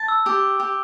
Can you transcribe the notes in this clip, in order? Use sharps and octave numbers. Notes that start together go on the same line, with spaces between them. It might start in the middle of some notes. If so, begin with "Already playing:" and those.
Already playing: A5
E6
G4 E6
G4